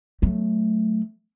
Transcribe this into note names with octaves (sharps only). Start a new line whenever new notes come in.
F#3 A3